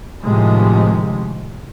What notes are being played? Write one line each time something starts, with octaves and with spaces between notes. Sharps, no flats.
A2 C3 D#3 F3 G#3